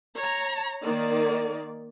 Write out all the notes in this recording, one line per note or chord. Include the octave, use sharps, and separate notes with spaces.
C#5 A#5
D#3 A#3 D5